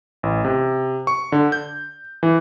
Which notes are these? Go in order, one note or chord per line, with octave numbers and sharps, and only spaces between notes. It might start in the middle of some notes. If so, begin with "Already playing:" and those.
A1
C3
C#6
D3
G6
E3